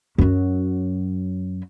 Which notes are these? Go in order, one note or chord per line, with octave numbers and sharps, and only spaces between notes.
F#2 F#3